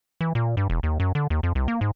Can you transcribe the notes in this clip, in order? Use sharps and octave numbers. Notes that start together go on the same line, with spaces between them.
E3
A#2
G2
E1
D#2
F#2
D3
D#2
F2
C2
A#3
G#2